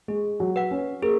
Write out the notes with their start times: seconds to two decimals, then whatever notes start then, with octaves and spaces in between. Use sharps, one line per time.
0.08 G#3 G#4
0.40 F#3
0.56 B4 F#5
0.71 C#4
1.02 A#3 G#4